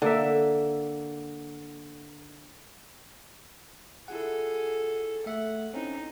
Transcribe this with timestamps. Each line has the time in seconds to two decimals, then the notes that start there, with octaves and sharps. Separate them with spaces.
0.02 D3 A#3 E5
4.08 E4 F4 G#4 A4 F#5
5.26 A3 E5 F#5
5.74 C4 C#4 D#4 E4